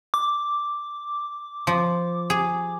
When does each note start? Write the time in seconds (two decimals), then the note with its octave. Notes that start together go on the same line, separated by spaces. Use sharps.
0.14 D6
1.67 F3
2.30 G#4